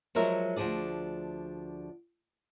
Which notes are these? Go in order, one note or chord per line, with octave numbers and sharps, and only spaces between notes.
F3 F#3 G#3 A#4 E5
D2 F3 D4 G#4 D5